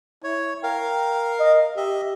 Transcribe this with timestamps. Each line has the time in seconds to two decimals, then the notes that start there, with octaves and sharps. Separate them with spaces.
0.24 E4 C#5
0.63 A#4 F5 G5
1.40 D#5
1.77 G4 D#5 E5